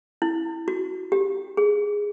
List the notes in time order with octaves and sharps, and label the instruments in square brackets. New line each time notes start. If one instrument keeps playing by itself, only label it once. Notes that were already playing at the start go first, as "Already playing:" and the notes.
[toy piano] E4
F#4
G4
G#4